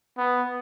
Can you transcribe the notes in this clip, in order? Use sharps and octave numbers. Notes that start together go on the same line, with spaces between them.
B3